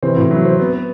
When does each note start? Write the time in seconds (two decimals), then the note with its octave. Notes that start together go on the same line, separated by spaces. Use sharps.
0.03 C3 E3 C4
0.17 A2
0.31 F#3
0.45 C4
0.59 B3
0.73 B3